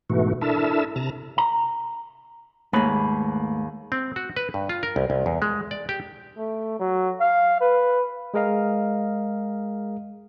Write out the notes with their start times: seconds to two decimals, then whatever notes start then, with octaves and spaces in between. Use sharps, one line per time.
0.10 G#2 B2 E3 A3 F#4
0.41 D4 E4 A4 A#4 E5 A5
0.96 C3 A5 A#5
1.38 A#5
2.73 D#2 G#2 A3 B4 B5
3.92 C4
4.16 F#4
4.36 B4
4.54 G2
4.69 F4
4.83 A#4
4.96 C2
5.10 C2
5.26 E2
5.42 G#3
5.71 D5
5.89 G4
6.37 A3
6.80 F#3
7.20 F5
7.61 B4
8.34 G#3 G#4 A#4 D#5 F5